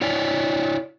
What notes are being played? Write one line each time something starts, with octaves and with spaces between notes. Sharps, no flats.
E4 C#5 D5 G#5